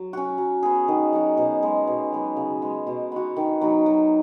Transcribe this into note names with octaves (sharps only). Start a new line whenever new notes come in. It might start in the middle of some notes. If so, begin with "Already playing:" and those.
Already playing: F#3
C#4 F#4
F#3
B3 G#4
D#3
F#3 D#4 F#4
B2
G#3 B3
B2
F#3 B3
C#3
G#3 B3
B2
B3 F#4
D#3
F#3 B3 D#4
F#3